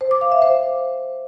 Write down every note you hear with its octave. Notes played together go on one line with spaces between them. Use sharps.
C5
D6
F5
E5
C5